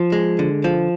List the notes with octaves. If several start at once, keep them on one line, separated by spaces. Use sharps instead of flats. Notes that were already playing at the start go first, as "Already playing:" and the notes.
Already playing: F3
G#3
D3
F3